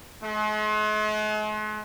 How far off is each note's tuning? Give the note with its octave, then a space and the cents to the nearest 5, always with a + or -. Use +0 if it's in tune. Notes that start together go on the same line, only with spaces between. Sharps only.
G#3 +45